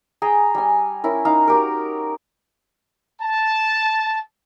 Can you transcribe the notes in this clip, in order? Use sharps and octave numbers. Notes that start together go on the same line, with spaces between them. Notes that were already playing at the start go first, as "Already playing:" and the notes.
G#4 G5 A#5
G3 G#5
C#4 E4 A#4
D#4 F5 A#5
F#4 G4 A#4
A5